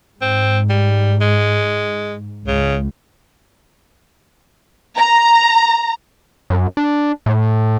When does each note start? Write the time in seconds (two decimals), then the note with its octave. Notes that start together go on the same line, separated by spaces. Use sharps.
0.22 G#2 C4
0.70 G3
1.21 G#3
2.47 C#2 C#3
4.96 A#5
6.50 F#2
6.77 D4
7.26 A2